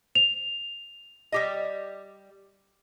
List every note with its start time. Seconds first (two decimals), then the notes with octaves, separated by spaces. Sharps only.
0.15 F7
1.32 G3 G4 D#5